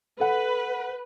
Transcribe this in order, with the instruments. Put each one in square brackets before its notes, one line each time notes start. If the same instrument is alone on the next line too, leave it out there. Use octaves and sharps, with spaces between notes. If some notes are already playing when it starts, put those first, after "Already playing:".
[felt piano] A4 F#5 [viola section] B4